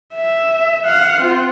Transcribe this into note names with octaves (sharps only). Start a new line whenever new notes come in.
E5
F5 F#5
C4 F4